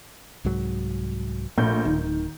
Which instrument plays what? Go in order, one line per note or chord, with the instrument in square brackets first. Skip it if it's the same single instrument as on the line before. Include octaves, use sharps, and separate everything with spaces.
[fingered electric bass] C2 G#2 F#3
[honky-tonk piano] A#1 G6 [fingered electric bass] A3
[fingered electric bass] D1 [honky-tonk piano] D#3